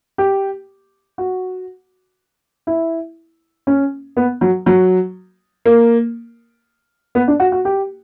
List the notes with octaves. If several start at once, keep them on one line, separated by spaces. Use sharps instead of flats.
G4
F#4
E4
C#4
B3
F#3
F#3
A#3
B3
D4
F#4
F#4
G4